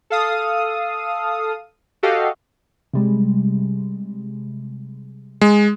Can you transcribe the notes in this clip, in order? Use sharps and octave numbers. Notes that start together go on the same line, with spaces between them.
A4 F5 D#6
F#4 G4 A4 D#5 F5
C3 G3 G#3
G#3